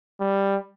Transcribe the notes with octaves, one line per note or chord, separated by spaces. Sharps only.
G3